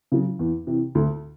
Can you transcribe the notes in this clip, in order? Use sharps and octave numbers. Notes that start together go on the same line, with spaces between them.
C#3 F#3
E2
C3 E3
D2